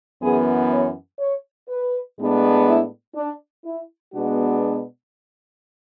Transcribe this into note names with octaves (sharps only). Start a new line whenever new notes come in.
F#2 E3 B3 G#4
C#5
C#5
B4
A2 G#3 B3 D4
E4
D4
E4
B2 G#3 B3 D4 F#4